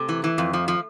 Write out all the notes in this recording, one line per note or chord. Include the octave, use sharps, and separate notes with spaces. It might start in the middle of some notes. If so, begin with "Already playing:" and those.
Already playing: C3 A3
E3
E3
F2
F3
F3